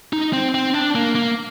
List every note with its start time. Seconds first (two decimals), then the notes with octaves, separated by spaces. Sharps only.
0.13 D#4
0.33 C4
0.54 C4
0.75 D4
0.95 A#3
1.15 A#3